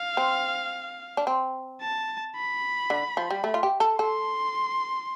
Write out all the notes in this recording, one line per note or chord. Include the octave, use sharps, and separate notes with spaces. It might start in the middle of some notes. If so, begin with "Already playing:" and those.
Already playing: F5
C4
D4
C4
A5
B5
D3
F3
G3
A3
F4
G4
A4
A4 C6